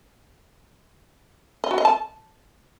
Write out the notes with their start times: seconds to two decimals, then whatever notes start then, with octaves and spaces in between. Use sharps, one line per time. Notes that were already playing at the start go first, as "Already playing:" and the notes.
1.64 D#5
1.71 F#4
1.78 D#5
1.85 A5